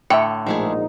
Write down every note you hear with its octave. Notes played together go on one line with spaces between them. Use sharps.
A2 D3 E5 G5 C#7
A#1 G#2 F3 A3 D#4 G#4